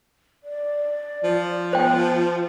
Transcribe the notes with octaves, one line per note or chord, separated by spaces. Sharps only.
D5
F3
B3 C5 G5